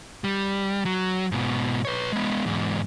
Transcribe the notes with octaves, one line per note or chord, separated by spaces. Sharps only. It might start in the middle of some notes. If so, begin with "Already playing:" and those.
G3
F#3
G#2 B2
B4 C#5
G#3 B3
E2 G#2